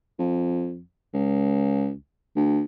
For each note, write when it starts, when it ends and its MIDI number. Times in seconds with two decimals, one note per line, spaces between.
0.19 0.80 41
1.14 1.93 37
2.36 2.62 38